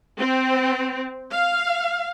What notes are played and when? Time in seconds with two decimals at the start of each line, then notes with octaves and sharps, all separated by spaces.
0.18 C4
1.31 F5